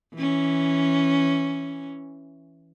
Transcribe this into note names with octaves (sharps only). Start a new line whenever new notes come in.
E3 C#4